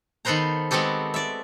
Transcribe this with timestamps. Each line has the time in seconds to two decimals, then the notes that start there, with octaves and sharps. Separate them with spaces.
0.25 D#3 B3 A4 B4 C5 A#5
0.71 G#3 B3 C4 F#4 G4 A4
1.14 D5 E5